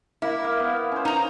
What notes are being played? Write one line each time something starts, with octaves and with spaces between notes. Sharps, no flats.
A#3 E4
A#3 F5
B3
C#4 C5
D#4 A#5